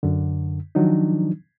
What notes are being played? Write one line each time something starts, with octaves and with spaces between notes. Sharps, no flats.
F#2 D3
D#3 F3 F#3 D4 D#4